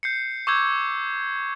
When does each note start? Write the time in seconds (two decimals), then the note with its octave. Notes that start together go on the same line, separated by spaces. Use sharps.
0.03 G6 C7 C#7
0.47 C#6 D6 E6 G6 G#6